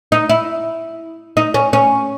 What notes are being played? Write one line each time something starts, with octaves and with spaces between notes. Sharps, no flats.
D#4
E4
D#4
C#4
C#4